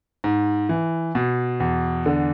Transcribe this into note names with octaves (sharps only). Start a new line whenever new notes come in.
G#2
E3
B2
E2
D3